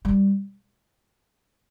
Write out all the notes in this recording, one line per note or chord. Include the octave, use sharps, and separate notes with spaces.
G3